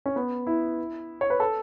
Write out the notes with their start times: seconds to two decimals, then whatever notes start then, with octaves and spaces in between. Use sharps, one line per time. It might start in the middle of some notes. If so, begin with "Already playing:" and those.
0.06 C#4
0.16 B3
0.47 E4
1.21 C#5
1.30 B4
1.40 A4